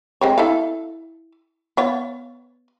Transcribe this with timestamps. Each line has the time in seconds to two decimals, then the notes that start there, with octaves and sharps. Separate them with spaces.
0.21 G#3 C4 C#5
0.38 E4 A4 F5
1.77 B3 C#5 F5